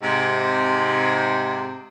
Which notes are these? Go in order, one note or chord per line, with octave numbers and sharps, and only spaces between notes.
G#2 C3